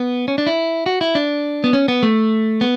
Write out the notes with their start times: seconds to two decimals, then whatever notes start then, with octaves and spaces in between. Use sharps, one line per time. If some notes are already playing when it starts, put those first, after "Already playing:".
Already playing: B3
0.28 C#4
0.38 D4
0.47 E4
0.86 F#4
1.01 E4
1.15 D4
1.64 B3
1.73 C#4
1.88 B3
2.03 A3
2.61 B3